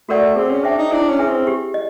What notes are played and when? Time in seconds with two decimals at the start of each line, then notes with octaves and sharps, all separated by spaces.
0.09 A3 F#4 A#4 D5 F#5
0.36 C4 G#4
0.51 C#4
0.63 D4 C5 E5 G5
0.78 D#4
0.92 D4 E4
1.09 C#4
1.19 G#4 B4 E5 G#5
1.28 C4
1.47 G4
1.74 D#5